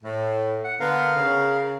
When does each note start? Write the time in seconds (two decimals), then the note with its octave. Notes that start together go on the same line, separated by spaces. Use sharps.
0.03 A2
0.64 F#5
0.80 D3 B3 A#4 F5
1.17 C#3